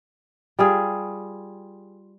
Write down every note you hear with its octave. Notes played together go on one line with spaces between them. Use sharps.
G3 F4 G#4